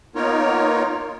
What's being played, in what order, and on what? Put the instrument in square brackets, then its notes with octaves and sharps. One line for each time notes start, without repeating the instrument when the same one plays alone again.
[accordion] A#3 B3 D#4 F4 A#4 C#5